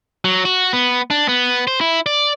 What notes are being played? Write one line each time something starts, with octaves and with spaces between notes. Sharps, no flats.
F#3
F#4
B3
D4
B3
C5
E4
D5